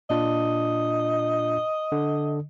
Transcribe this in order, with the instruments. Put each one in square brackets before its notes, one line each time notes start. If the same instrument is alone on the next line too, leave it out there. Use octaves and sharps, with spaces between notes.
[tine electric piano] A#2 D4 F4 [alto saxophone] D#5
[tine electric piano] D3